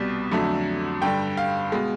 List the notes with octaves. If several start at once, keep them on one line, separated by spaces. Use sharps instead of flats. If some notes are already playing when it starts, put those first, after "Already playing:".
Already playing: C2 B2 G3
F2 D3 F#3 A3
G2 D3 G3 G5
F5
B2 G#3